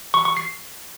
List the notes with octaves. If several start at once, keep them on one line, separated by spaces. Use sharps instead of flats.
C#6
C#6
C7